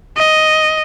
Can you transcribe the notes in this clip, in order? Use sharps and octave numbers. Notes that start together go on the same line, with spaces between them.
D#5